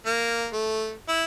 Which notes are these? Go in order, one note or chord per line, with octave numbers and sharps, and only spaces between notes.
A#3
A3
E4